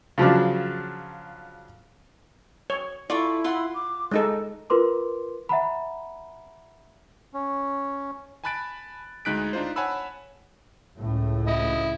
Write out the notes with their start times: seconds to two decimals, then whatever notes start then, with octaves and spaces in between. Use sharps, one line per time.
0.18 C#3 F3 F#3 D4
2.70 C#5
3.10 E4 F4 A4 D5 C#6
3.44 F4 F#5 C6
3.74 D6
4.11 G#3 D#4 A4 D#5
4.70 F4 A#4 B4 C6 D6
5.49 E5 F#5 A#5 B5
7.34 C#4
8.44 G#5 A5 B5 F#6 A6 D7
9.25 D2 G#3 D#4 F#6 B6 D7
9.53 D4 D#4 F4 C5
9.76 C#5 F#5 G#5 A5 B5 E6
10.98 C#2 A2
11.47 E4 D#5